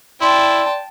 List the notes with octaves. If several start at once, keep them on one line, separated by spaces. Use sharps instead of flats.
E4 D5 G5 A5 C6